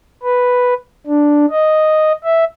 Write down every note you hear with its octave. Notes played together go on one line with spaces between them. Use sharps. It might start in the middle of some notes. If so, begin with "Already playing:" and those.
B4
D4
D#5
E5